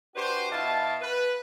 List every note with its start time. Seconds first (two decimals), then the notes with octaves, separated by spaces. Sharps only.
0.16 D4 F#4 G4 B4 C5
0.51 B2 E4 F5 A5
1.01 B4